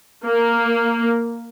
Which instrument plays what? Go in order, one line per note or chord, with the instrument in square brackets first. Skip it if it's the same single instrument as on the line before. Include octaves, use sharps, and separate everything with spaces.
[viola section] A#3